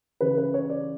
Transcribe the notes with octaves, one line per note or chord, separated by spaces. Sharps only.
C#3 E3 B4
B4
C#5
D5